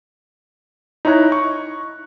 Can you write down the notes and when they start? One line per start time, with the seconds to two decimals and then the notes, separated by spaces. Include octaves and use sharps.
1.05 D#4 E4 C#5 A#5 F#6
1.32 C#6